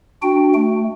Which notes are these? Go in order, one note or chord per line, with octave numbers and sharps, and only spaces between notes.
D4 F#4 G5
A3